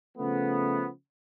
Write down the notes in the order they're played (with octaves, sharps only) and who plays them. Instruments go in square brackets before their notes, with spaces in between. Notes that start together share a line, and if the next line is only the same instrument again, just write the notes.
[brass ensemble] C#3 F3 A3 B3